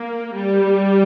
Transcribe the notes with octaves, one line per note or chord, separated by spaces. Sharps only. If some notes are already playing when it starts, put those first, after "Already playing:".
Already playing: A#3
G3